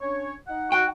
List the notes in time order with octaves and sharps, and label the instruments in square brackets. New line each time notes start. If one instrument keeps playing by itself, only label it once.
[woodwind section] C#4 D4 C#5
D#4 F#5
[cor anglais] F#4 [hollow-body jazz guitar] G5